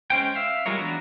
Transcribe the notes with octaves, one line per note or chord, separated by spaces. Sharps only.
G#3 C#4 C5 G5
E5 F5
G3 G#3 F4 A#4 C#5
E3 B3 D4 F#4 A#5